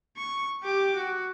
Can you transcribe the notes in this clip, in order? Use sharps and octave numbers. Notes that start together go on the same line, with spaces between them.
C#6
G4 D6
F#4